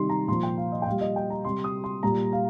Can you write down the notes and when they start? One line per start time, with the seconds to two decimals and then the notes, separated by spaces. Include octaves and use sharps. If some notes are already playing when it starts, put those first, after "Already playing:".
Already playing: C3 D#3 G3 C6
0.09 A#5
0.28 A#2 F3 C6
0.43 G5
0.58 F5
0.72 D#5
0.82 G5
0.87 A#2 G3 F5
1.01 D#5
1.16 G5
1.30 A#5
1.45 C3 G3 C6
1.64 D#6
1.84 C6
2.03 A#2 G3 A#5
2.33 F5